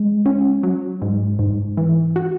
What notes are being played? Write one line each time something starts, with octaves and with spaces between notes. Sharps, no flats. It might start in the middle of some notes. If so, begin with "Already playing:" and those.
Already playing: G#3
C#4
F#3
G#2
G#2
E3
F#4